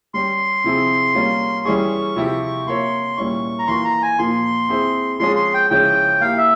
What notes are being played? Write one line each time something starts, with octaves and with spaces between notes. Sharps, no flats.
G3 C#4 G4 C6
C3 F3 C4 E4 G#4
G3 A#3 C#4 F4
E3 G3 C#4 E4 G#4 C#6
C3 F3 C4 E4 G4
A#3 F4 A#4 C#5 E5 C6
A#2 G3 C#4 E4 C#6
A#5
E3 A#3 F4 C6
A#5
G#5
A#2 F3 A#3 C6
C4 E4 G#4 C5 E5
F3 G#3 C#4 F4 G#4 C6
C6
G5
C#3 F3 G#3 C#4 E4 G5
A#3 E4 G4 F5
E5